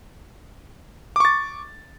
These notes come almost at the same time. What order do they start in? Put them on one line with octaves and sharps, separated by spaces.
D6 C#6 A6